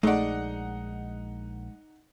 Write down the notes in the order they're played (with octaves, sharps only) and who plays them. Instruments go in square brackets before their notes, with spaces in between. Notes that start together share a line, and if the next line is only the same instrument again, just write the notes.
[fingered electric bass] A#1 [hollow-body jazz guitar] G#3 D5 [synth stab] A3 [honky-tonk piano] D#4 F#5